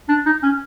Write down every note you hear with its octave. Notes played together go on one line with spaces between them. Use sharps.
D4
D#4
C#4